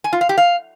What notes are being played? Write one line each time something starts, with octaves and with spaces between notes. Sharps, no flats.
G#5
F4
F5
G4
F5